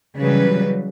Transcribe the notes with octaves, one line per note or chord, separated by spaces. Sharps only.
C#3 E3 F#3 G3 B4